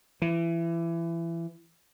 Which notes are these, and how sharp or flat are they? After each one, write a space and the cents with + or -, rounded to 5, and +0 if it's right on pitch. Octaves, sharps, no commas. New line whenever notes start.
E3 +25